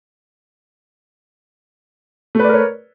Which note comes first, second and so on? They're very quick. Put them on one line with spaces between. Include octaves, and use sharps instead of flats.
A3 B4 D5 A#4 C#5